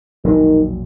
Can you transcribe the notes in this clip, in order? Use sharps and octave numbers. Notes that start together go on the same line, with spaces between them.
E1 A#1 D#3 F#3